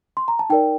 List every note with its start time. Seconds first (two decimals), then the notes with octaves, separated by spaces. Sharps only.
0.17 C6
0.28 A#5
0.39 A5
0.50 D#4 A#4 D5 G5